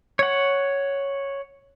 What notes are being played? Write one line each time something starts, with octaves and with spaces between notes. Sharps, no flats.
C#5 F#5